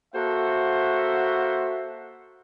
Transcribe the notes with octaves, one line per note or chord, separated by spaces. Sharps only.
A#3 F#4 A4 C5 E5 F#5